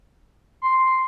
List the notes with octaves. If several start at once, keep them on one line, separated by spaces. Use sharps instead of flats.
C6